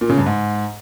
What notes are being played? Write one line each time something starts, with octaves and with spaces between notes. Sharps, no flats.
A#2
C#3
G2
G#2